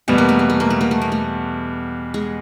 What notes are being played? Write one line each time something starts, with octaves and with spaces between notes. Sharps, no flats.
E2 B2 G3 A3 B3
A#3
A3
A#3
A3
A#3
A3
A#3
A3
A#3
A3
G#3